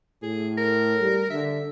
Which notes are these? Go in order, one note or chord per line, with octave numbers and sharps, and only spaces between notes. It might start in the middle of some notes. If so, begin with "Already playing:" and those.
A2 G#4
A#4
G3
D3 E5